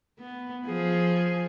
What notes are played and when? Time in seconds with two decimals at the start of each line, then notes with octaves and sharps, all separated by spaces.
0.19 B3
0.66 F3 G#4